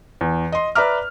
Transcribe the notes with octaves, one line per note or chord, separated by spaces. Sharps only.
E2
D#5 C6
B4 D5 E5 A#5 D6 F6